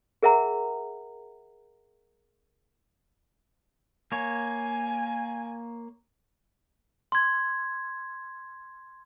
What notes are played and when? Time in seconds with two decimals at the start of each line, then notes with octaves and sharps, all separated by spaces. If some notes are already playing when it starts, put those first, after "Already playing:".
0.23 G#4 A#4 E5 F#5 A#5
4.12 A#3 C#5 G#5
7.12 C6 G#6